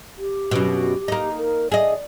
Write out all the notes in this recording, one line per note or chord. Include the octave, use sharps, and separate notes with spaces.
G4
F#2 B2
A#3 D#4
A#4
G#4 D5 D#5